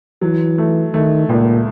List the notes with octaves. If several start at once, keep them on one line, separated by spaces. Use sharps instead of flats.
E3 F#3
A3
D#3 A3
C#2 A#2